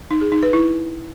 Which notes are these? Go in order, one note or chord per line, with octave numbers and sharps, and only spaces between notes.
D#4
G#4
D#4
B4
E4